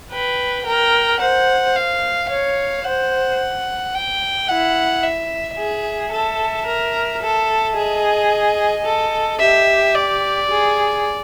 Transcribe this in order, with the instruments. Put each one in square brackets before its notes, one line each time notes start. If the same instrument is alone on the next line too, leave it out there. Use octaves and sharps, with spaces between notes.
[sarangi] B4 [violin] G5
[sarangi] A#4 [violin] G5
[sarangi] C5 [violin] F#5
[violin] F5
[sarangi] C#5 [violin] F5
[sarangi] C5 [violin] F#5
[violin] G5
[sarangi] E4 [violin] F#5
[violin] E5
[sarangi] G#4 [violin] E5
[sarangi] A4
A#4
A4
[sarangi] G#4 [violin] D#5
[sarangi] A4
[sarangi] G4 [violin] E5
[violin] D5
[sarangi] G#4